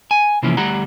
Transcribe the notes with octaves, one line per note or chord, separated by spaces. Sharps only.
G#5
C3 E3 F3 A#3 C#4
D2 G3 F#5 A#5